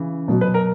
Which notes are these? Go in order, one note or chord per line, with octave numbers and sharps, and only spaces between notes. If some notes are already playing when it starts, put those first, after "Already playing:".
Already playing: C#3 E3
B2 F#3
B4
A#4